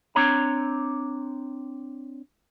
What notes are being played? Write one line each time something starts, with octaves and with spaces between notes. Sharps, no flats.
C4 D4 C#5 A#5